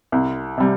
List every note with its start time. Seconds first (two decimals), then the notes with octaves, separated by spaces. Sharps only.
0.12 C2
0.58 C3 G3